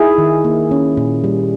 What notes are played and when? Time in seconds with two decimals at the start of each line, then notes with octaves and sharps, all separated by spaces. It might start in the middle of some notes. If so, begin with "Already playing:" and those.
Already playing: D#4 E4 G#4
0.18 D#3
0.44 A#3
0.71 C#4
0.97 A#2
1.24 G3